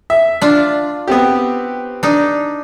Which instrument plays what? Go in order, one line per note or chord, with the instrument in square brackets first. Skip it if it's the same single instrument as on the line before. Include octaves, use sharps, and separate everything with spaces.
[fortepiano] E5
[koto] D4 F4
[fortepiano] B3 C4 G4
[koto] D4 D#4